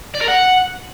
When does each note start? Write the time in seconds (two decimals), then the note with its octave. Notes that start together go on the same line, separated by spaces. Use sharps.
0.15 D5
0.22 A#4
0.28 F#5